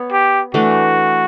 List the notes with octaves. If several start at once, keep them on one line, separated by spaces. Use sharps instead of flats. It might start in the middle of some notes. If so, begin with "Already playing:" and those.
Already playing: B3 C#5
G4
E3 A3 D4 F#4